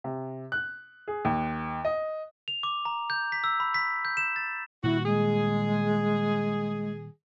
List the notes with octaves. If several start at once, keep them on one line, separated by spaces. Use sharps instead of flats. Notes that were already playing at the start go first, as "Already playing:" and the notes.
C3
F#6
G#4
D#2
D#5
F7
D6
A#5
G6
B6
E6
B5
B6
G6
E7
A6
A#2 D#3 G3 E4 F#4
G#3 G#4